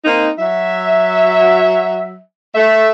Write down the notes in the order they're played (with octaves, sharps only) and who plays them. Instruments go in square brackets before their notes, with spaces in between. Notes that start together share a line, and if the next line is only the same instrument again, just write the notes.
[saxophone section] A#3 C4 D#4
F#3 E5
A3 E5